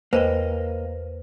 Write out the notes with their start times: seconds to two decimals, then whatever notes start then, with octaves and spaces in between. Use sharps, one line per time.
0.13 E2 A#3 B4 C5 D#5 G5